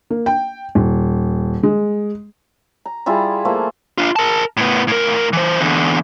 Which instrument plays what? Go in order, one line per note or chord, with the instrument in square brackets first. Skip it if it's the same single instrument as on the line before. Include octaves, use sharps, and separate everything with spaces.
[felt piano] A#3
G5
D#1
G#3
[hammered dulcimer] A#5
G3 E4 F4 G#4
F3 A3 A#3
[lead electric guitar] D4 F4
A#4 A5
A2 B3
A2 A#4
E3 C5
E2 D3